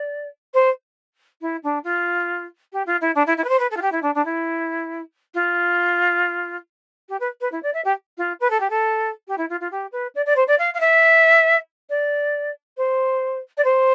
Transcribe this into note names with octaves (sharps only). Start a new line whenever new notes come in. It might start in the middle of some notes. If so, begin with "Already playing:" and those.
Already playing: D5
C5
E4
D4
F4
G4
F4
E4
D4
E4
E4
B4
C5
B4
A4
F4
G4
E4
D4
D4
E4
F4
G4
B4
B4
E4
D5
E5
G4
F4
B4
A4
G4
A4
G4
E4
F4
F4
G4
B4
D5
D5
C5
D5
F5
F5
E5
D5
C5
D5
C5